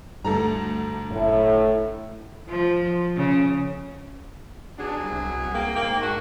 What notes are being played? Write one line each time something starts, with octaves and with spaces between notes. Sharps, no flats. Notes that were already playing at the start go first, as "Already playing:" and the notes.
D2 G2 A4 A#5
F#1 A2
F3
C#3
B2 F#3 D4 G#4
C2
A#3 G5
G#2 A#3
D4 F#4 C#6